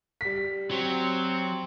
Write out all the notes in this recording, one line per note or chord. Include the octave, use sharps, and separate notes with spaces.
G3 B6
F#3 C4